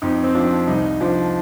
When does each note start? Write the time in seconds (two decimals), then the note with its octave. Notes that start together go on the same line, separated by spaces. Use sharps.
0.02 F2 D#4
0.23 C4
0.35 F3 D4
0.68 C2 D#4
1.01 F3 D4